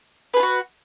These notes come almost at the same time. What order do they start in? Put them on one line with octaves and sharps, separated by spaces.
B4 G#4 F4 F#4